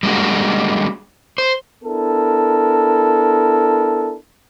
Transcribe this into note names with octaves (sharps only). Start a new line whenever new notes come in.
G3 G#3 A#3 D4 F#4
C5
B3 D4 E4 A4 A#4